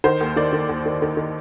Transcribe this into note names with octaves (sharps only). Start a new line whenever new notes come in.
D#3 C5
D#2
D#3 D5
D#3
D#2
D#3
D#3
D#3